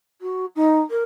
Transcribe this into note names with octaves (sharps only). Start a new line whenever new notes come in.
F#4
D#4
A#4